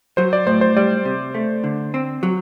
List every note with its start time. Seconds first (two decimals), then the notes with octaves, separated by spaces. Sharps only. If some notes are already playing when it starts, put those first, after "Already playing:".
0.17 F#3 C5
0.33 D5
0.47 A2 C5
0.61 C5
0.77 G3 D5
1.05 C3
1.35 A3
1.64 D3
1.94 C4
2.23 F#3